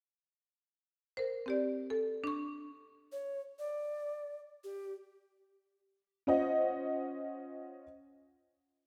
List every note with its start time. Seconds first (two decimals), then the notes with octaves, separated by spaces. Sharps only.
1.17 A#4 C5
1.46 C4 G4 D5
1.90 A4
2.24 D4 C#6
3.12 C#5
3.59 D5
4.64 G4
6.27 C#4 F4 C5 D#5 F#5